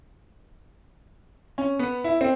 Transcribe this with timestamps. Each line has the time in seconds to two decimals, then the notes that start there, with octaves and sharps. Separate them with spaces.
1.58 C#4
1.79 B3
2.04 E4
2.21 C4